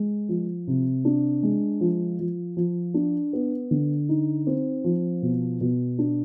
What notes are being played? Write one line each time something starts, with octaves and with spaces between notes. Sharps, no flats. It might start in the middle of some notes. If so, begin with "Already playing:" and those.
Already playing: G#3
F3
C3
D4
G#3
F3
F3
F3
D4
B3
D3
D#4
C4
F3
B2
B2
D4